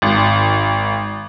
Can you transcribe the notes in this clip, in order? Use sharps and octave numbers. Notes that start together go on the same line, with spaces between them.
G#1